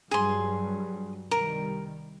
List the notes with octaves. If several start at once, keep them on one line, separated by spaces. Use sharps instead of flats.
G2 F#3 G3 G#4 C6
C2 D#3 G3 A#4